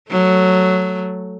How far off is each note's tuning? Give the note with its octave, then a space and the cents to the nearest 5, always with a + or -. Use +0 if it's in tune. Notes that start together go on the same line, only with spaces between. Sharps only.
F#3 +0 A3 +0